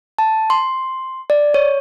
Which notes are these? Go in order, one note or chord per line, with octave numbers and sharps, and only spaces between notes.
A5
C6
D5
C#5